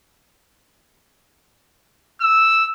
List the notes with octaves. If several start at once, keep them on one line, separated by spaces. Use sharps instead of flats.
E6